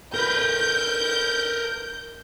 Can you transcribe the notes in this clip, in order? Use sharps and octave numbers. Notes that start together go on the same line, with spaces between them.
A#4 B4 G6